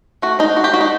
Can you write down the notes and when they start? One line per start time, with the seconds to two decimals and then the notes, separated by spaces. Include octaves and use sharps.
0.22 A3 F#4
0.39 D4 D#4
0.56 D4 F#4
0.64 G4
0.73 D4 F#4
0.81 D#4